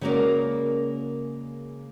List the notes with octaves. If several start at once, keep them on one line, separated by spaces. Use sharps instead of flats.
C#3 G#3 A#3 F#4 A#4 D5